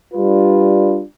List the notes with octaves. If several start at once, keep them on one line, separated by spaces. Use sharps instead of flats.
G3 D4 F4 B4